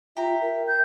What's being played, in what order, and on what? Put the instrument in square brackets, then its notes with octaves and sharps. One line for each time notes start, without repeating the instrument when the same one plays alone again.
[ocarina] F4 [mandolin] G4 A#5 [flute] E5
[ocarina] A#4
[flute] G6